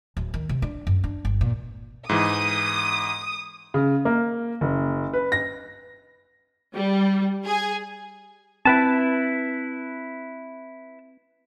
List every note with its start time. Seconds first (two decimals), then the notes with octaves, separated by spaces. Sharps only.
0.17 D1
0.34 D#3
0.49 C3
0.62 D4
0.87 F#2
1.04 D4
1.25 G1
1.41 A#2
2.09 G#2 E3 D#6
3.74 C#3
4.05 A#3
4.61 F#1
5.13 B4
5.32 A#6
6.74 G3
7.45 G#4
8.65 C4 E4 B4 A5